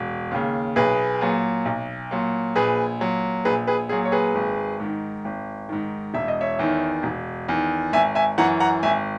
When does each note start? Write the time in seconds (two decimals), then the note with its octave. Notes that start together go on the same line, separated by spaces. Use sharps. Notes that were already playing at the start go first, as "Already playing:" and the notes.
Already playing: E1
0.31 D#2 C#3
0.76 B1 G#4 B4
1.21 A#2 F#3
1.65 B1
2.11 A#2 F#3
2.56 A#1 G#4 B4
3.00 A#2 F#3
3.45 A#1 G#4 B4
3.67 G#4 B4
3.89 A#2 F#3 G#4
4.05 C#5
4.12 G#4 B4
4.35 G#1
4.79 G#2 D#3
5.25 G#1
5.69 G#2 D#3
6.14 E1 E5
6.28 D#5
6.41 C#5 E5
6.59 E2 D#3
7.03 E1
7.49 E2 D#3
7.93 G#1 E5 G#5
8.15 E5 G#5
8.38 F#2 E3 F#5 A#5
8.60 F#5 A#5
8.83 G#1 E5 G#5